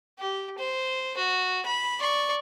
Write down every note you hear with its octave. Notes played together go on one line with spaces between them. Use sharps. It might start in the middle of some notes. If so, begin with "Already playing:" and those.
G4
C5
F#4
B5
D5 C#6